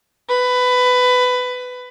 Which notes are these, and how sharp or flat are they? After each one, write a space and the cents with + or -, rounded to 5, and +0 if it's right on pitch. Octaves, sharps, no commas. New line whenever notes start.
B4 +15